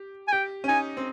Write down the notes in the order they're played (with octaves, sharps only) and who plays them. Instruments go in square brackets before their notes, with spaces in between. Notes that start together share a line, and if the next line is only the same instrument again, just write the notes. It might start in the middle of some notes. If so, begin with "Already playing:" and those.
Already playing: [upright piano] G4
[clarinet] G#5
[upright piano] G4 [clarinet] G5
[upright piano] C#4
[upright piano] D#4 [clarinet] G#5
[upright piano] C4